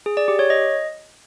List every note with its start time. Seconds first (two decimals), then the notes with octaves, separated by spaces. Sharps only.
0.06 G#4
0.17 D5
0.28 G4
0.39 C#5
0.50 D#5